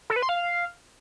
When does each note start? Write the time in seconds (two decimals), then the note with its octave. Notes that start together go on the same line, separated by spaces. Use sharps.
0.10 A4
0.16 B4
0.23 C6
0.29 F5